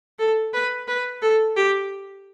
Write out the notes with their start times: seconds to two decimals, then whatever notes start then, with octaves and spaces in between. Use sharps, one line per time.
0.19 A4
0.53 B4
0.88 B4
1.22 A4
1.56 G4